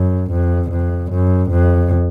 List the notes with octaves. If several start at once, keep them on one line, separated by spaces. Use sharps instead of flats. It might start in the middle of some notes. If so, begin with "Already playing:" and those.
Already playing: F#2
F2
F2
F#2
F2